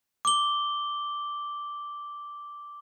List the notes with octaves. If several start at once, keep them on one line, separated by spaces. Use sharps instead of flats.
D6 G7